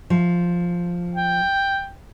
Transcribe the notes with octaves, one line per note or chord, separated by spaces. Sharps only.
F3
G5